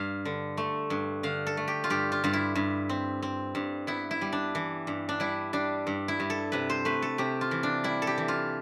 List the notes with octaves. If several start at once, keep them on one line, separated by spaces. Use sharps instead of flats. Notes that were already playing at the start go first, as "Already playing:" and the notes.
Already playing: G2 F5
D3
A3
G2
D3 F5
A4
A3
G4
F4
G2 G4
F4
G2 F4
E4
G2
C4
C4
G2
B3 E4
E4
G3
D4
E3
G2
D4
G3 E4
G3 D4
G2
E4
G2
A4
C3 B4
C5
A3 B4
A4
C3 G4
F4
E3
D4
G3 E4
A4
G4
E3
F4